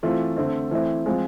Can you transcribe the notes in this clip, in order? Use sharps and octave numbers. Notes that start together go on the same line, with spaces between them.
E3 A3 C4 F4
D3 A3 C4
E3 A3 C4 E4
F3 G#3 C4 F4